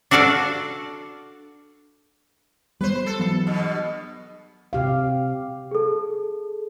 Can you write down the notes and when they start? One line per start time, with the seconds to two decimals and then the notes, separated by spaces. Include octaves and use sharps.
0.11 D4 F#4 A4 D5 F5
2.81 G3 B3 B4 C5
3.06 A4
3.20 E3 F#3 B3
3.47 G2 B2
4.73 C3 G4 F5
5.71 G#4 A4